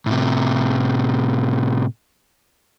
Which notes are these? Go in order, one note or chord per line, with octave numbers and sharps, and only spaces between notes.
A2 C3